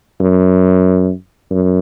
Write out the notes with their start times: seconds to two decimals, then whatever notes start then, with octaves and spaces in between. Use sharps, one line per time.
0.20 F#2
1.51 F#2